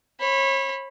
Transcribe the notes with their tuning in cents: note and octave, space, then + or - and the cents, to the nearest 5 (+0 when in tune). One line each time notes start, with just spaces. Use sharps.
C#5 -35 B5 +0